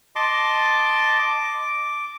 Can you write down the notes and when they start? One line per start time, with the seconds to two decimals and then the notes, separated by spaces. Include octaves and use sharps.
0.16 D#5 A5 C6 D6
1.19 D6